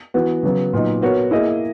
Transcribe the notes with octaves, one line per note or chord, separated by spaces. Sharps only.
E3 B3 F#4
C#3 F#3 B3
A#2 F#3 B3 D#4
B3 F#4 A#4 C#5
A#3 E4 G#4 D#5